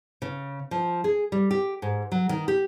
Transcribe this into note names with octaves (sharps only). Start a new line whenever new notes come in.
C#3
F3
G#4
G3
G4
G#2
F#3
D#3
G4